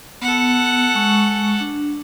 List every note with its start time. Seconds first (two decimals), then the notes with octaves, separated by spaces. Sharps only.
0.22 B3 A4 F#5
0.94 G#3 C#6
1.60 D4